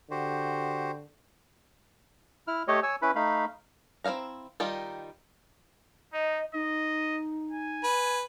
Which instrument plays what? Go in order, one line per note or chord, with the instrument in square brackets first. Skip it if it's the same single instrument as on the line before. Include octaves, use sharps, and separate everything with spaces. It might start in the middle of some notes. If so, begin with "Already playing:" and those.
[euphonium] D3 [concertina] F#4 G4 C5
[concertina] E4 F6
A3 G4 C#5 D#5
C#5 G#5 E6
C#4 E4 B4 B5
A3 D#4 F5 B5
[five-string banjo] C4 E4 E5 F5 A#5
D#3 G3 D#4 F4 G4
[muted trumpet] D#4 [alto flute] D#5
[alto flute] D#4 [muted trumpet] D#5
[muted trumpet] G#5
[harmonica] B4